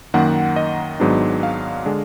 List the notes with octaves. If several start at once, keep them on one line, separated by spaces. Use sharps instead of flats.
F#2 D#3 A#3 F#5
D#5
G#1 G#2 F#3 B3 D4
F5
D3 G#3 D4